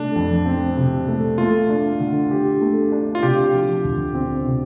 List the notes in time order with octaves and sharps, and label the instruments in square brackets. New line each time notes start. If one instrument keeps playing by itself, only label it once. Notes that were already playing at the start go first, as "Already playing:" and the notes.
Already playing: [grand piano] C3 A3 [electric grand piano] D4
[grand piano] F2
C4
C3
A3
[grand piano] A3 [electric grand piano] F4
[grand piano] D4
D3
G4
A3
D4
[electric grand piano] F4
[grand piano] C3 [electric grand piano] G4
[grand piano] F3
D2
C4
C3